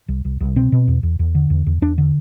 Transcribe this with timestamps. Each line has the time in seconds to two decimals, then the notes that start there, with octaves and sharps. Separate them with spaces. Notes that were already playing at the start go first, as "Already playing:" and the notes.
0.08 C2
0.25 C2
0.40 C2
0.56 B2 C4
0.72 B2
0.88 E2
1.03 E2
1.19 E2
1.35 D3
1.50 E2
1.66 E2
1.82 E2 D4
1.98 D3